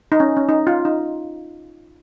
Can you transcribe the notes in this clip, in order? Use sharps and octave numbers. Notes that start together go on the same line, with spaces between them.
D#4
C#4
C#4
D#4
F4
D#4